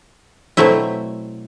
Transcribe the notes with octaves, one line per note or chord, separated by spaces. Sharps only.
B2 F#3 A3 C4 E4